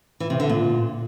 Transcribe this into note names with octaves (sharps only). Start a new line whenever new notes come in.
E3
C3
D3
A#2